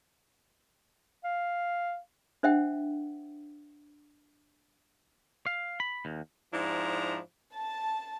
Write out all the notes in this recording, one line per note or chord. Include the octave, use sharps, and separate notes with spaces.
F5
D4 C5 E5 F#5 G5
F5
B5
D#2
G#2 F3 D4 E4 A#5
A5